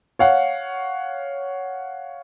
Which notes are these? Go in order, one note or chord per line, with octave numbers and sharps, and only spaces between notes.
C#5 F5 F#5